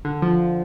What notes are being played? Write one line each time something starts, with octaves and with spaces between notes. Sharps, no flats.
D3
F3